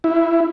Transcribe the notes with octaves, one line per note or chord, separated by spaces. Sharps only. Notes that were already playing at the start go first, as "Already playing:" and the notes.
E4